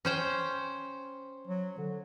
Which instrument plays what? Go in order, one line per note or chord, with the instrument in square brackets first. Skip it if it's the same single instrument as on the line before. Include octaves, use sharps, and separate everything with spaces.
[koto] C#4 C5 G5
[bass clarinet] F#3
D3